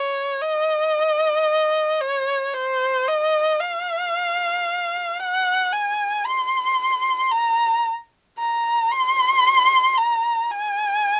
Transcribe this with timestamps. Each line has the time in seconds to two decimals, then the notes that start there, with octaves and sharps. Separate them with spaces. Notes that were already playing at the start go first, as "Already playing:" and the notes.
Already playing: C#5
0.41 D#5
2.01 C#5
2.54 C5
3.08 D#5
3.60 F5
5.20 F#5
5.72 G#5
6.26 C6
7.32 A#5
8.39 A#5
8.92 C6
9.98 A#5
10.51 G#5